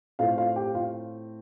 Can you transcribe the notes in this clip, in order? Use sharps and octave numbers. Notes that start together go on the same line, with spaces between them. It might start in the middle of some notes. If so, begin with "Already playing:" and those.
A2 A3 C4 F4 F5
F4 F5
G4 G5
F4 F5